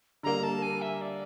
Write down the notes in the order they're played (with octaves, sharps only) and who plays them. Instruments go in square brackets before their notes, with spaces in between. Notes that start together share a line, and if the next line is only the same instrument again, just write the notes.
[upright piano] D3 G3 A#3 [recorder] A#5
[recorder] A5
G#5
E5
D5